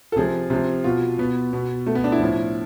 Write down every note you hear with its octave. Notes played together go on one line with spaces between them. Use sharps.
A4
C3 F3 G#4
C3 F3
B2 F4
B2 B3
B2
B2 A3
B3
D4
E4
A2 F3